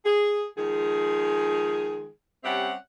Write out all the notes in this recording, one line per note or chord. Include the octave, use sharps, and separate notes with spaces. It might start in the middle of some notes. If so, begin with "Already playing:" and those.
G#4
D#3 F3 G#3 G#4
G3 C4 C#4 G4 E5 F#5